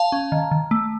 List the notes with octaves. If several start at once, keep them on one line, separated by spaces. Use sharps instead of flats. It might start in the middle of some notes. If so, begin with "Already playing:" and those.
Already playing: F5 A5
C#4
D#3
D#3
A3